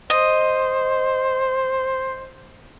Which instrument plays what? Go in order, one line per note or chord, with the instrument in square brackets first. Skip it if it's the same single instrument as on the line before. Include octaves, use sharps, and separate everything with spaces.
[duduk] C5 [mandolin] D#5